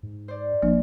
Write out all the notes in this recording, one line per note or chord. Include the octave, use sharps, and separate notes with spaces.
G#2
C5 D5
G#1 F3 A#3 D4